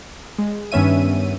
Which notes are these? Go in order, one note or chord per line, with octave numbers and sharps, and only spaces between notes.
G#3
G2 D#3 B3 C#4 E5 D#7